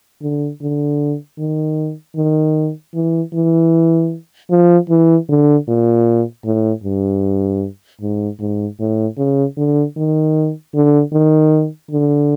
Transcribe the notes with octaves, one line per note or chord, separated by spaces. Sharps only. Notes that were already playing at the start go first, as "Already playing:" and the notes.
D3
D3
D#3
D#3
E3
E3
F3
E3
D3
A#2
A2
G2
G#2
G#2
A2
C#3
D3
D#3
D3
D#3
D3